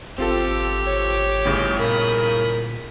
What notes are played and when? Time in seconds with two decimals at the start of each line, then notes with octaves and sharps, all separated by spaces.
0.18 G#1 C4 F4 G4 A4
0.87 C#5
1.45 G1 A2 C#3
1.79 A#2 A#4 B5 D#6